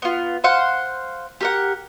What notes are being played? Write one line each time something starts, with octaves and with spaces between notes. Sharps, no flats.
B3 F4
C5 F5 F#5
G4 A#4 F#5